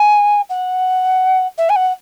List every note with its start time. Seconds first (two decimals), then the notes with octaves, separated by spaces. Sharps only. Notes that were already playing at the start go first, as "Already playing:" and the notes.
Already playing: G#5
0.50 F#5
1.58 E5
1.69 G#5
1.76 F#5